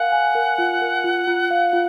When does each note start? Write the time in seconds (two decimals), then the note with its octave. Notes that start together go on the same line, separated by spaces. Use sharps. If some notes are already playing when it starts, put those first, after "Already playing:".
Already playing: A#4 F5 F#5 G#5
0.12 G#5
0.35 A#4
0.58 F4
0.81 A#4
1.04 F4
1.27 F4
1.51 F5
1.73 F4